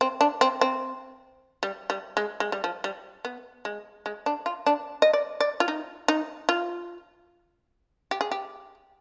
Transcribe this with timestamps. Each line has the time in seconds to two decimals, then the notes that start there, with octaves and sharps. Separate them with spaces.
0.01 C4
0.21 D4
0.41 C4
0.61 C4
1.63 G3
1.90 G3
2.17 G#3
2.40 G#3
2.52 G3
2.64 F3
2.84 G3
3.25 B3
3.65 G#3
4.06 G#3
4.26 D4
4.46 F4
4.66 D4
5.02 D#5
5.13 D5
5.40 D5
5.60 F4
5.68 D#4
6.08 D#4
6.49 F4
8.11 G4
8.21 G#4
8.31 G4